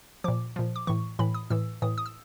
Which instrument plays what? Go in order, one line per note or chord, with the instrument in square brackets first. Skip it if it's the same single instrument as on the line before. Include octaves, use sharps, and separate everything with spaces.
[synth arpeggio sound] A#2 F3 D6
A#2 F3
D6
A2 E3 C#6
A2 E3 B5
D#6
A2 E3 E6
A2 E3 D#6
D#6
E6